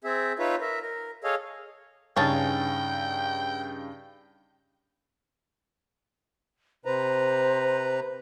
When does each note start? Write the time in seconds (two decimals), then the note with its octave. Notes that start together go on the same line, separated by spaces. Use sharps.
0.04 C4 G#4 E5
0.39 D#4 F4 B4 C#5 E5
0.61 A#4 E5
0.83 A#4
1.24 G#4 A4 C#5 D#5 F5
2.17 G2 C#3 C#4 D#4 G#4 G5 A5
6.85 C3 B4 C5 A#5